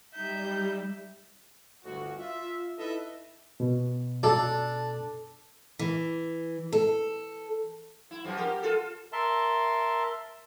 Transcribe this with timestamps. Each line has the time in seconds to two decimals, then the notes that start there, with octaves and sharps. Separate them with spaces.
0.15 G3 D#4 E5 G6
1.85 G1 D2 F#4
2.19 F4 E5
2.78 D#4 E4 A4 B4 D#5 E5
3.60 B2
4.23 D4 A4
5.79 E3
6.73 A4
8.11 E4
8.24 F#2 F3
8.37 G4 A#4
8.63 F4 A4
9.13 A#4 E5 A5 C6